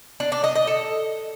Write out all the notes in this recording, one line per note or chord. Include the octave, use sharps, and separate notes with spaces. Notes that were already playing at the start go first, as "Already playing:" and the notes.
D4
D4
D#5
D#5
A4